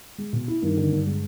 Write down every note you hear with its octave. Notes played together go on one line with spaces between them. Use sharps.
G#3
B2
E4
G2 D#3
D3
G2
G#3